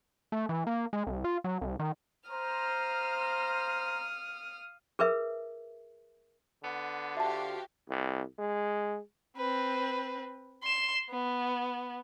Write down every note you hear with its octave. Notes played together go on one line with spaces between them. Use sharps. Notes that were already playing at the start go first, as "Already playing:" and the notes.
A3
E3
A#3
G#3
C2
F4
F#3
C2
D#3
C5 F5 A#5 D#6 F6
G#4 A#4 B4 E5
D3 B3
F3 F#4 G4 E5 F5 A5
C2
G#3
C4 B4
C6 E7
B3